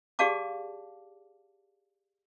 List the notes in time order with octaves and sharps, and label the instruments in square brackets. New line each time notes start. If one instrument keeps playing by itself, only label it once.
[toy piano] G4 G#4 D5 F5 A5 D6